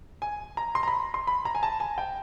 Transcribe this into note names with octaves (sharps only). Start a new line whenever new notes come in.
G#5
A#5
C6
A#5
B5
C6
B5
A#5
G#5
A5
G#5
G5